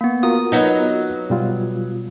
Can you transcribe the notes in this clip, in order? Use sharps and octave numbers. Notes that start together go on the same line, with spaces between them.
A#3 B3
F4 F#4 A#4 D#6
F#3 B3 D#4
B2 G3 F4